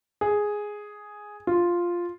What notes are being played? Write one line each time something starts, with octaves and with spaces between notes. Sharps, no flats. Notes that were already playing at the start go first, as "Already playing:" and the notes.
G#4
F4